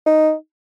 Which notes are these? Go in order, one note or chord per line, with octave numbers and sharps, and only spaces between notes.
D#4